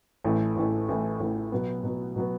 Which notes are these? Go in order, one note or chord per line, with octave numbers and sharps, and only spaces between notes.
A1 A2 E3 A3
A1 A2 E3 A3
A1 A2 E3 A3
A1 A2 E3 A3
B2 F#3 B3
B2 F#3 B3
B2 F#3 B3